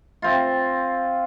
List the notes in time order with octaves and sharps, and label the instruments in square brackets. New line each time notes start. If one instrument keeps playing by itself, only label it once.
[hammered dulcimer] C4 F4